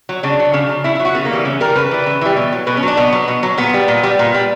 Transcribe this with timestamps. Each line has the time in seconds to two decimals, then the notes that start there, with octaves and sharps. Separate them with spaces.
0.09 F#3
0.23 C#3 D4
0.40 F#3
0.54 C#3
0.69 F#3
0.84 C#3 E4
0.95 E4
1.00 F#3
1.05 F#4
1.15 C#3 B3
1.25 A#3
1.31 E3 G3 B3
1.45 C#3 C#4
1.60 E3 G3 A#4
1.76 C#3 B4
1.91 E3 G3
2.06 C#3
2.21 E3 G3
2.37 B2
2.52 F#3
2.67 B2 B4
2.77 C#4
2.83 F#3 D4
2.97 B2 B3
3.13 F#3
3.28 B2
3.43 F#3
3.58 A#2 B3
3.74 G3
3.88 A#2
4.03 G3
4.19 A#2
4.34 G3